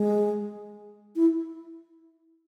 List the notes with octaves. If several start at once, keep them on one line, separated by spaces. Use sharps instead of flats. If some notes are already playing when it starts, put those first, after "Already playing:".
Already playing: G#3
E4